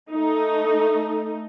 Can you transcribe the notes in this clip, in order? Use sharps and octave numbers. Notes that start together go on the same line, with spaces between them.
A3 D#4